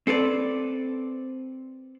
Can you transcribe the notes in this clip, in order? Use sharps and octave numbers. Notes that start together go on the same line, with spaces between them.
C4 A4 B4 D5